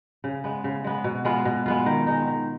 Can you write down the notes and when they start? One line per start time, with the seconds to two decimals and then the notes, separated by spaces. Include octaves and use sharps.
0.24 C#3
0.44 G#3 B3
0.64 C#3
0.84 G#3 B3
1.04 B2
1.25 G#3 B3 F4
1.45 B2
1.66 G#3 B3 F4
1.86 D#3
2.07 G#3 D#4
2.27 D#3